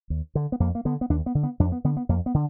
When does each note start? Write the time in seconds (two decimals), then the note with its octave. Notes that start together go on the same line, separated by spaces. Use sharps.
0.10 D#2
0.35 D3
0.52 B3
0.60 F2 A#3
0.75 A#3
0.85 D3 B3
1.01 B3
1.10 D#2 D4
1.26 B3
1.35 D3
1.43 B3
1.60 F2 D4
1.72 B3
1.84 D3 B3
1.97 B3
2.09 F2 A#3
2.26 B3
2.34 D3